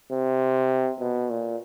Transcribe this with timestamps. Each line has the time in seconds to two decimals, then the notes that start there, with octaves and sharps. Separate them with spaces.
0.12 C3
1.00 B2
1.30 A#2